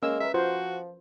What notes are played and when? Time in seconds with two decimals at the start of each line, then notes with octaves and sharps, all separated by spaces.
0.03 G#3 A#3 C#4 E6
0.21 A#4 B4 E5
0.34 F3 F4 F#4 A#4 C5